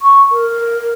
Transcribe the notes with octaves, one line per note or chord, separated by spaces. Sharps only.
C#6
A#4